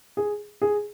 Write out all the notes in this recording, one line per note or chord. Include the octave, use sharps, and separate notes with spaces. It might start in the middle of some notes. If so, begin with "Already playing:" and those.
G#4
G#4